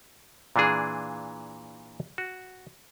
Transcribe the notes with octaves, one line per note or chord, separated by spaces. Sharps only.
A#2 E3 D4 G#4
F#4